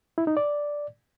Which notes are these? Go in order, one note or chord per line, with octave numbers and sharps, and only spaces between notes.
E4
D#4
D5